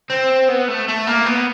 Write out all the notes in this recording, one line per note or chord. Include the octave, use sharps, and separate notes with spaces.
C4
B3
A3
A3
A#3
B3